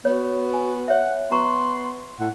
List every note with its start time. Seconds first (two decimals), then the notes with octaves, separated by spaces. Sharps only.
0.05 B3 F#4 C#5
0.53 G#5
0.88 C#5 E5 F#5
1.31 B3 F#4 A#5 C6 C#6
2.20 A2 F#5